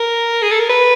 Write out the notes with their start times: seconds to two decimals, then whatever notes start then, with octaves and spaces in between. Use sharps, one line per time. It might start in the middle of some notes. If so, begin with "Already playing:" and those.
Already playing: A#4
0.42 G#4
0.51 A4
0.60 A#4
0.69 B4